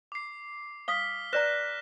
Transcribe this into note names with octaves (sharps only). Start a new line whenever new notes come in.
D6 C7
F5 D#6 F6 B6 G7
B4 D5 A#5 F#6 A#6 E7